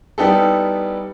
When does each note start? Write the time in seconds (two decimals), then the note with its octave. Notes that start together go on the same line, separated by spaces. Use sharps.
0.18 G3 B3 D#4 E4 G4 A4